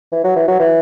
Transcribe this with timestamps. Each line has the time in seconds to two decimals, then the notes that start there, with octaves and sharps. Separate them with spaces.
0.12 E3
0.24 F#3
0.36 E3
0.48 F#3
0.59 E3